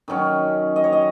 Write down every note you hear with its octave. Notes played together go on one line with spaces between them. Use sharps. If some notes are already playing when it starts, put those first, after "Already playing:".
D#3 F#3 C#4
D#5
C#5
D#5